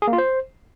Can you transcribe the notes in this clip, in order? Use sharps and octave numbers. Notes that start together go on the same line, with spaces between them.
G#4
A#3
F4
C5